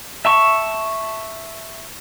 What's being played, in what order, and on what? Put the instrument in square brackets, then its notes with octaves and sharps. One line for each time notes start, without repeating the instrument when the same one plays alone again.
[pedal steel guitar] E5 A5 C#6